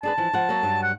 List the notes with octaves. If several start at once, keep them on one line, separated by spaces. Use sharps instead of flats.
D4 G#4 B4 A5
E3 F3
F3 F#5
F#3 A#3
G2 F#3
F#5